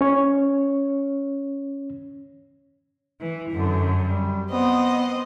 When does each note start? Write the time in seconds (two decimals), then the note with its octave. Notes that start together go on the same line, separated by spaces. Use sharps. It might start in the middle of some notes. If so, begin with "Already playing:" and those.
0.01 C#4 C#5
3.20 E3
3.50 F#2 D3
4.02 G3
4.50 B3 C4 D#5